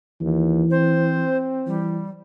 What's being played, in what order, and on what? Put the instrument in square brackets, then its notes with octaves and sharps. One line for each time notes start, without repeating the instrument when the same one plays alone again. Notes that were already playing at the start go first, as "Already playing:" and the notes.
[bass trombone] D#2 [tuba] E3
[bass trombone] C4 [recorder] C5
[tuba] E3 [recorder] G3